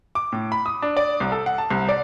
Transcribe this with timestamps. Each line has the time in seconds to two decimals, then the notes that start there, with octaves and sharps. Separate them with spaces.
0.15 D6
0.32 A2
0.52 B5
0.66 D#6
0.82 D4
0.97 D5
1.20 C2
1.32 A4
1.46 F#5
1.58 A5
1.71 C2
1.89 D5